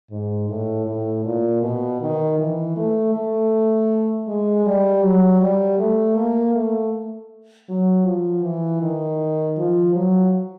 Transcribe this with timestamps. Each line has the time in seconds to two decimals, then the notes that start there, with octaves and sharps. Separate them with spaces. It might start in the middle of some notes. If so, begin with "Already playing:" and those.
0.10 G#2
0.48 A2
0.86 A2
1.25 A#2
1.62 B2
2.01 D#3
2.39 E3
2.77 A3
3.14 A3
4.27 G#3
4.66 G3
5.03 F#3
5.41 G3
5.79 A3
6.16 A#3
6.55 A3
7.69 F#3
8.06 F3
8.43 E3
8.82 D#3
9.57 F3
9.95 F#3